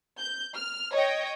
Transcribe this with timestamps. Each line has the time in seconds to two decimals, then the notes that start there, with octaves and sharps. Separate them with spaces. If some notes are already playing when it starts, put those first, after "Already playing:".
0.18 G6
0.54 F6
0.91 C#5 D#5 G5